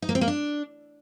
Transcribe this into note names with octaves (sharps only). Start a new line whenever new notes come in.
D#4
A#3
C4
A#3
D4